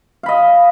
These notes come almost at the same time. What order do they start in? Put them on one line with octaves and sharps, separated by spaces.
F5 B5 D#5